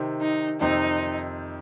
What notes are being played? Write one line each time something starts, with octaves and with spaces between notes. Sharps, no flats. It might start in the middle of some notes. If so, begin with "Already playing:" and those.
Already playing: C3 D#3 C4
D#4
F2 C3 D#3 C4 D#4